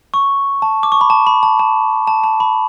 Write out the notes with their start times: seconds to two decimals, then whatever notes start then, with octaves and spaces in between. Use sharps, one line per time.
0.14 C#6
0.62 A5
0.83 D6
0.92 C#6
1.01 B5
1.10 A5
1.27 B5
1.43 A5
1.59 A5
2.07 A5
2.24 A5
2.40 B5